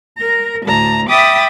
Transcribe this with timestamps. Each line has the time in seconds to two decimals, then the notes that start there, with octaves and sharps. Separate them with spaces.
0.16 A#4 A#5
0.64 D2 A2 A5 A#5
1.08 E5 G5 B5 D6 D#6 A6